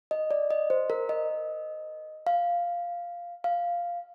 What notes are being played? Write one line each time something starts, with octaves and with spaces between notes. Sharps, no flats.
D#5
D5
D#5
C5
A#4
D#5
F5
F5